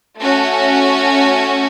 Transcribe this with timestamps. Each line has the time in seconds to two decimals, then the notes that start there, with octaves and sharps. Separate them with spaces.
0.20 A3 C#4 F#4